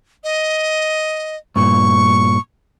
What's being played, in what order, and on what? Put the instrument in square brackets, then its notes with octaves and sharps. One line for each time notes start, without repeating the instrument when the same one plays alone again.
[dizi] D#5
[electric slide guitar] G2 A#2 [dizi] C#6